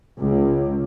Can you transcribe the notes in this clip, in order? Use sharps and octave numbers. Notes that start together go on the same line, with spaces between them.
C#2